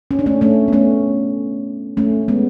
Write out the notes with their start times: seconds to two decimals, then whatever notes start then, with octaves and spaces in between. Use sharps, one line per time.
0.11 C#4
0.19 D4
0.26 A3 C#4
0.41 A3 C#4
0.68 B3
0.73 A3 C#4
1.97 A3 C#4
2.28 G#3 B3